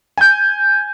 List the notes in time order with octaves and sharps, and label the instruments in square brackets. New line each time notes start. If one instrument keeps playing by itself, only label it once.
[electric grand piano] G#5 G6